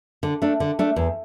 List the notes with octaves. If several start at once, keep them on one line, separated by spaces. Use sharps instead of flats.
D3
A3 D4
D3
A3 D4
E2